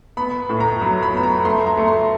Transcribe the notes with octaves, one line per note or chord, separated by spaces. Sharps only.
B3 B5
A2
A#5
F#3 B5
B5
B3 B5
A#5
A3 C6
A#5
A3
C6